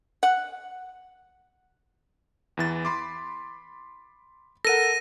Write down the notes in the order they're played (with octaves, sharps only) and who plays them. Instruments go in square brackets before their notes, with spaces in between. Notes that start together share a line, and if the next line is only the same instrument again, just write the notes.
[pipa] F#5
[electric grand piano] E2 E3 A6
B5 C6 D6
[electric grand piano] A4 A#4 F#5 [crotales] A#6 D#7